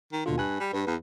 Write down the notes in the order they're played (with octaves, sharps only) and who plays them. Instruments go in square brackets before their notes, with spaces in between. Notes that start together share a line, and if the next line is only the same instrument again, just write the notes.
[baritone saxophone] D#3
[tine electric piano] D#2 B2 F4 [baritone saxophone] D3
[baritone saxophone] G2 [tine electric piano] G#5 F#6
[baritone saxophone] G3
[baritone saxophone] G2 [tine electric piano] B4
[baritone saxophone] E2